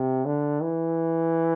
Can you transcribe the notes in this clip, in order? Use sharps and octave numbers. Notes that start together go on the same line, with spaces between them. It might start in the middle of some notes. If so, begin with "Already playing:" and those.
Already playing: C3
D3
E3